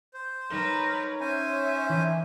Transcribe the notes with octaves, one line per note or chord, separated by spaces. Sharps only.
C5
G3 D#4 A#4 B4 C#5 E7
C#4 C5 E5 G#5
D#3 E3 D4 E4